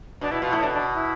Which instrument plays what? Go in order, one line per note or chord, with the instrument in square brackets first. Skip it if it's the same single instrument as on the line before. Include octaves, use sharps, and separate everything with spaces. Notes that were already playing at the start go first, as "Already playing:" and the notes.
[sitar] B2 [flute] D4
[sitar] B2 [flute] E4
[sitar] B2 [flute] F4
[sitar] A2 [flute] E4
[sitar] B2 [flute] D4
[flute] D4
E4